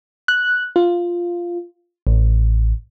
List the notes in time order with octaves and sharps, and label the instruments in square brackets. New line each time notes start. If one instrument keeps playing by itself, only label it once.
[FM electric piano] F#6
F4
A1